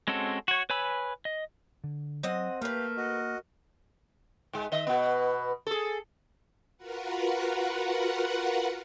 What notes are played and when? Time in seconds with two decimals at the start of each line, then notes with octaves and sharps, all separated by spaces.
0.08 G#3 C4 C#4 F#4 A4
0.48 F#4 C#5
0.70 B4 C#5 G#5 B5 E6
1.25 D#5
1.84 D3
2.23 F#3 C4 D#5 F#5
2.62 A3 A#3 G4 A#4 B4 F5
2.97 F#4 D#5
4.53 G#2 G#3
4.72 D#3 D#5 E5
4.87 B2 B3
5.67 G#4 A4
6.77 F4 F#4 A#4 B4 F#5